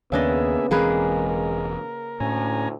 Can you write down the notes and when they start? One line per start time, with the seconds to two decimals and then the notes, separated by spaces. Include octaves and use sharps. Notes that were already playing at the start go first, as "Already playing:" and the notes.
0.12 D#2 C#3 A#3 B3 D4 G#4 D#5 E5
0.71 E1 E3 G#3 A#3 C4 G#4 A#4 B4
1.29 A#4
2.20 D2 A2 C#4 G#5 A#5